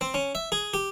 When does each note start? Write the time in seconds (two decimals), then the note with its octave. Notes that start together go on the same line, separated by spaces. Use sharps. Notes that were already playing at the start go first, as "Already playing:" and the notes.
0.01 C4
0.14 C#4
0.35 E5
0.52 G#4
0.74 G4